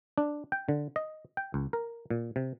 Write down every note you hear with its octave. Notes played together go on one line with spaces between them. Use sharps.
D4
G5
D3
D#5
G5
C#2
A#4
A#2
C3